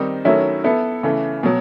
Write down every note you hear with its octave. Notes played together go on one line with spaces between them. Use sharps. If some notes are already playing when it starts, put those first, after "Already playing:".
Already playing: D#3 G3 C4 D#4
D#3 F#3 A3 C#4 E4
B3 E4 A4
C#3 E3 A3
B2 F#3